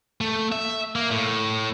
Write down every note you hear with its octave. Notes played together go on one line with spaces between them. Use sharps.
A3
E5
A#3
A2